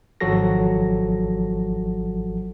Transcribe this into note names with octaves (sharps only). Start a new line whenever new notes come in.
G#1 F3 F#3 F#4 A4 A#6